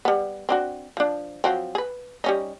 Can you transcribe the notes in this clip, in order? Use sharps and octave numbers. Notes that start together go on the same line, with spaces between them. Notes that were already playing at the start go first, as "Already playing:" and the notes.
G3 B3
C4 D4 F#4
F3 D4
F3 F#3 C4
G#4 B4
G3 C#4 D#4